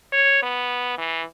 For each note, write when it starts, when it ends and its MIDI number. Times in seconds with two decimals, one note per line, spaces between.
0.12 0.41 73
0.43 0.97 59
0.98 1.23 52